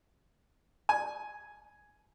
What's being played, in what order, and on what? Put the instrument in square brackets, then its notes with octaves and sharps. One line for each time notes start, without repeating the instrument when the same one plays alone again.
[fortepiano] G#5